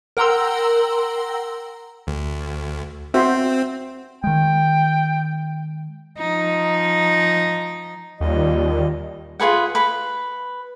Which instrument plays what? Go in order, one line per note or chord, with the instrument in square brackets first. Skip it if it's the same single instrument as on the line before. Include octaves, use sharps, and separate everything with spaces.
[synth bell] A#4 F#5 G5 A#5 C6 E6
[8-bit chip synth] D2
[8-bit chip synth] C4 [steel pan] F#4 C5 E5
[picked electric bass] D#3 G#3 [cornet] G5
[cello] F3 D#4
[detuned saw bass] D#2 [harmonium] A#2 G3 D#5
[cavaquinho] F4 G#4 B4 F#5
B4 B5